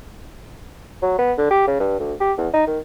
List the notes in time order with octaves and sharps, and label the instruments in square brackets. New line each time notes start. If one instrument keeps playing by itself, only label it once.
[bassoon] F#3
B3
D3
G4
C#3
G2
D2
G4
E2
D#4
D#3